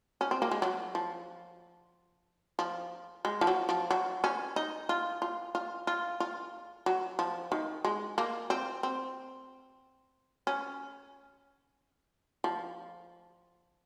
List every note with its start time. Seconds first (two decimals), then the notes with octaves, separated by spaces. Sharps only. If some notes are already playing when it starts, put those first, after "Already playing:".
0.21 C#4
0.31 C4
0.42 A#3
0.51 G#3
0.62 F#3
0.95 F3
2.59 F3
3.25 G#3
3.41 F3
3.47 F#3
3.69 F3
3.91 F#3
4.24 C#4
4.56 D#4
4.89 F4
5.22 F4
5.55 F4
5.87 F4
6.20 F4
6.86 F#3
7.19 F3
7.52 D#3
7.84 G#3
8.18 A#3
8.50 C4
8.83 C4
10.47 C#4
12.44 F3